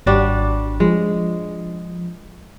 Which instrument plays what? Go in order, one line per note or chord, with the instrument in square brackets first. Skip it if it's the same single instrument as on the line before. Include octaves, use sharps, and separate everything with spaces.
[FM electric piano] G#1 [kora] G3 D4 F#4
[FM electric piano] F3 [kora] G#3